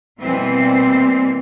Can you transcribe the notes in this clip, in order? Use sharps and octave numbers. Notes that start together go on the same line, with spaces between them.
B2 E3 G3 A#3 C4